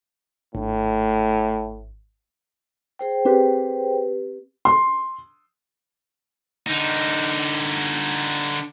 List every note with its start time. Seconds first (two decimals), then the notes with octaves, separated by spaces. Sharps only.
0.55 G#1 A2
2.99 G#4 C5 G5
3.25 C4 G4 B4
4.65 C6
6.66 D3 D#4